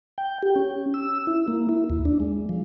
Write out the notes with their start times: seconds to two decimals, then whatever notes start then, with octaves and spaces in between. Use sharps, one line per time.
0.18 G5
0.43 G4
0.56 C#4
0.94 E6
1.27 E4
1.48 A#3
1.69 E4
1.90 D#2
2.05 D4
2.20 G#3
2.49 F3